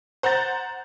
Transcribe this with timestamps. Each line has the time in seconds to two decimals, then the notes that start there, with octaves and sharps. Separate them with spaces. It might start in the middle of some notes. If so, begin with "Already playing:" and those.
0.23 C5 F#5 A#5 G6 A6